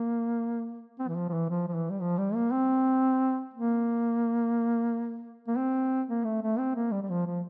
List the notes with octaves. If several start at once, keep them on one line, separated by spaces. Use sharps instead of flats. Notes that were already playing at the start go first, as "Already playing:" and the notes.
Already playing: A#3
C4
E3
F3
F3
E3
F3
F3
E3
G3
F3
G3
A#3
C4
A#3
A#3
C4
A#3
A3
A3
C4
A#3
G3
G3
F3
F3